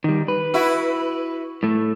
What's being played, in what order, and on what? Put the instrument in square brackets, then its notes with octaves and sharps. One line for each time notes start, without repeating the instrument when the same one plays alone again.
[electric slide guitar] D#3 G3
B4
[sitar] E4 F#4
[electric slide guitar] A2 A3